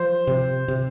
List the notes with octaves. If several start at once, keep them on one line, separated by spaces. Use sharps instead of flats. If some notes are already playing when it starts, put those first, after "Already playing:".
Already playing: F3 C5
C3
C3